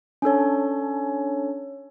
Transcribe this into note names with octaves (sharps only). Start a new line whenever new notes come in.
C#4 D4 A4 C#5